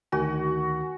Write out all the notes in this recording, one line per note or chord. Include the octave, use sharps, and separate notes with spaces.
D2 D#3 F#4 G#5